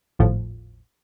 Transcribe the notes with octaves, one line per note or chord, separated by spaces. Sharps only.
G#1 D#2 A2 F3